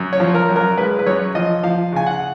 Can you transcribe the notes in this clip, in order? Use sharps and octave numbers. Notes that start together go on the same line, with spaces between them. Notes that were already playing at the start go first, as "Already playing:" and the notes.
Already playing: F#2
C#5
F3
A#4
F#2
A#4
G#3 B4
B4
F#2 C#5
F3 D#5
F3 F5
C#3 G#5
F#5